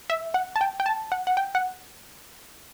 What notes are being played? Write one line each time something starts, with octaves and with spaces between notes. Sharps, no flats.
E5
F#5
A5
G5
G5
A5
F#5
F#5
G5
F#5